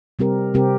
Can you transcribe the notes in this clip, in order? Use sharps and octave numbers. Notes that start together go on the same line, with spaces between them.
C3 G3 C4 G4 A#4
C3 G3 C4 G4 A#4